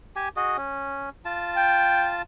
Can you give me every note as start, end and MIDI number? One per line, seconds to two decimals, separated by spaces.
0.16 0.29 67
0.16 0.29 80
0.36 0.57 66
0.36 0.57 68
0.36 0.57 75
0.57 1.09 61
1.25 2.22 65
1.25 2.22 81
1.56 2.11 79